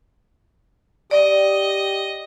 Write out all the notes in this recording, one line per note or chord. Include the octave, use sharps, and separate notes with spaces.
G4 D5 D#5